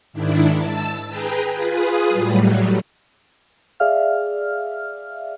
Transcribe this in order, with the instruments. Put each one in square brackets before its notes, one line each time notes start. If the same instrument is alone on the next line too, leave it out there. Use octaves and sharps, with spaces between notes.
[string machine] G#2 D#3 D4 E4
A5 E6
G#4 B4 G5 A#5
F4 G#4 B4 D#6
A2 F#3 G3
[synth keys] G#4 D5 E5 F5 F6